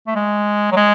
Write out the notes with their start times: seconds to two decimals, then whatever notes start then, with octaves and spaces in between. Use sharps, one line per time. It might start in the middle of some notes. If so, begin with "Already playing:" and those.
0.07 A3
0.15 G#3
0.72 F#3
0.76 G#3